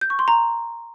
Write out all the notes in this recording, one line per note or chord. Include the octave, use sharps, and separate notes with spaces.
G6
C#6
C6
A#5